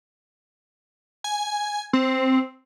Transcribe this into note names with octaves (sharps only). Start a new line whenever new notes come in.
G#5
C4